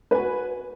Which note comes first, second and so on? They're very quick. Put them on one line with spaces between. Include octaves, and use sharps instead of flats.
B4 G#5 F#4